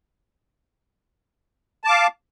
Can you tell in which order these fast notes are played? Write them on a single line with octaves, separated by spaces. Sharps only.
A5 D6 F5